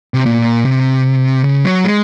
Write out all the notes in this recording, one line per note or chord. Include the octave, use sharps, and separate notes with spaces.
C3
A#2
C3
C#3
F#3
G#3